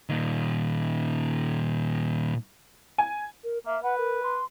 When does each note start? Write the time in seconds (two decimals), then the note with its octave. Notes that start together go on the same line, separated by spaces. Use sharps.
0.09 A#2 D#3
2.98 G#5
3.44 A#4
3.66 A#3 E5
3.83 B4 F#5
3.98 A#4
4.23 C6